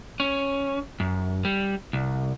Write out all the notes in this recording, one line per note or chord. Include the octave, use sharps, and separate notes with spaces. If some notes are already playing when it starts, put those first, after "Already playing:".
C#4
F#2
G3
C2